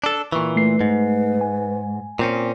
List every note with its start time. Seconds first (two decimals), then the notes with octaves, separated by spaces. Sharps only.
0.04 D4 A4
0.32 A#2 E3 C#6
0.56 A3 B4 C7
0.81 G#2
1.41 G#5
2.19 A#2 C4 C#4